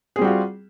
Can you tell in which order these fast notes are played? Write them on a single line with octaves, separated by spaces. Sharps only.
G#4 C4 G3 F#4 F4